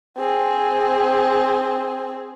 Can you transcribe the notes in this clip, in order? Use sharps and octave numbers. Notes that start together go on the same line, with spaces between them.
C4 G#4